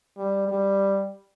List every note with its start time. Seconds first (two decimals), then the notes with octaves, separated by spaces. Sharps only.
0.18 G3
0.48 G3